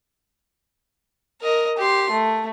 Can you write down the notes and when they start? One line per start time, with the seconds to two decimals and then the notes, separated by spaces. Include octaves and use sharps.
1.42 A#4 D#5
1.78 G4 C6
2.11 A3